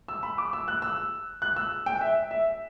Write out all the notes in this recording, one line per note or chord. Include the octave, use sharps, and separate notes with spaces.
E6
B5
D6
E6
F#6
E6
F#6
E6
G5
E5
E5